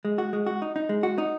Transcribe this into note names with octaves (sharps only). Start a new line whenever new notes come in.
G#3
F#4
G#3
F#4
D#4
D#4
G#3
F#4
D#4